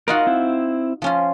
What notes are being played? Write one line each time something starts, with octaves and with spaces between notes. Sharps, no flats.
D#4 F4 F#4 A#4 D#5 F#5
C4 E4
F3 C#4 F4